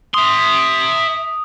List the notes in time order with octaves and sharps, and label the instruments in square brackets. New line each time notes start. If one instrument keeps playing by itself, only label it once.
[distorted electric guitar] E5 C6 [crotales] D#6